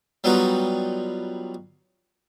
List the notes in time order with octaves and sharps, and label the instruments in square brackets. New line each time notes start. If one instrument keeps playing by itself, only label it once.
[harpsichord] F#3 G3 B3 D#4 F4 F#4